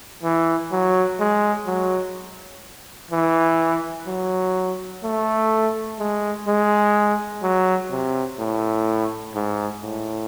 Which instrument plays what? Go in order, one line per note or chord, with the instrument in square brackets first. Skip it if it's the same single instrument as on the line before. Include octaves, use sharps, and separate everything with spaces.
[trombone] E3
F#3
G#3
F#3
E3
F#3
A3
G#3
G#3
F#3
C3
A2
G#2
A2